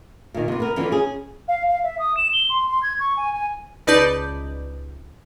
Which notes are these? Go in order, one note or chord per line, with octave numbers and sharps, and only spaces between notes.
A#2 D#3
C3 B3
B3 A#4
D3 E3 F3 C#4
C#4 G#4
F5
F5
E5
D#6
E7
G7
C6
C6
G#6
C#6
G#5
G#5
C#2 D#4 B4 D5 A5 G6